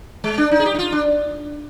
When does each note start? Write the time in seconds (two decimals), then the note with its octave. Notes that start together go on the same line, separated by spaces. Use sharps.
0.24 G#3
0.38 D4
0.51 D#4
0.60 G#4
0.66 G4
0.75 D#4
0.79 F4
0.92 D4